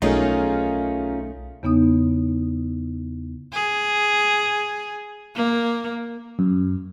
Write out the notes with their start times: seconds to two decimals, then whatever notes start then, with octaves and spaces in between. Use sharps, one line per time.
0.02 B1 A3 C#4 D#4 F4 G#4 A#4
1.63 E2 C#3 B3 D#4 D#6
3.52 G#4
5.35 A#3
6.39 F#2